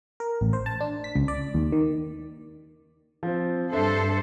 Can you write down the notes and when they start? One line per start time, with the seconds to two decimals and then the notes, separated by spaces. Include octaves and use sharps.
0.20 A#4
0.41 A1
0.53 C5
0.66 A5
0.81 D4
1.04 B6
1.15 C#2
1.28 D5
1.54 D#2
1.72 D#3
3.23 F3 C4
3.73 G2 D4 A4 C5 E5